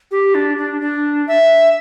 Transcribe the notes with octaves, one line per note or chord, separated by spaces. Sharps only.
G4
D4
D4
D4
E5